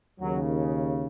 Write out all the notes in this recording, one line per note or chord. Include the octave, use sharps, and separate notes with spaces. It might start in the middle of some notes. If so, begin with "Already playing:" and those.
D#2 C#3 F#3